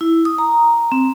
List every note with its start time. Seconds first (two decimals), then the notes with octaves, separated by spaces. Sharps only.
0.01 E4
0.25 D#6
0.38 A#5
0.92 C4